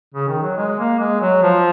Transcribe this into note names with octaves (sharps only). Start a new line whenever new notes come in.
C#3
D#3
F#3
G#3
A#3
G#3
F#3
F3